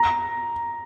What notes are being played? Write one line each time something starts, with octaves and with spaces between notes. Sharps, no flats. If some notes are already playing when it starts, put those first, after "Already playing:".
Already playing: A#5